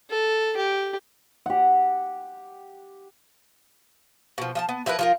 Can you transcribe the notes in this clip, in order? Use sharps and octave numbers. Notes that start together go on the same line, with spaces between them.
A4
G4
G4 F#5
B2 F3
F3 D#5 A5
B3
F3 E4 A#4 B4
F3 F4 A#4